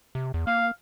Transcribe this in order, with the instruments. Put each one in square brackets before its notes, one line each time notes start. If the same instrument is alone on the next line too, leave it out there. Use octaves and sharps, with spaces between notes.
[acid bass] C3
E2
[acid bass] A#3 [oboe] F5